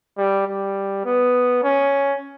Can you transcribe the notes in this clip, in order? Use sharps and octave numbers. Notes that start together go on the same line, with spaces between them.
G3
G3
B3
C#4